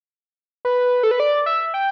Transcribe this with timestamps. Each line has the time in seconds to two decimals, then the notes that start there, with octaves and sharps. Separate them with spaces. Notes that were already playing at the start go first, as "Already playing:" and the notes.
0.65 B4
1.03 A4
1.11 B4
1.20 D5
1.46 E5
1.74 G5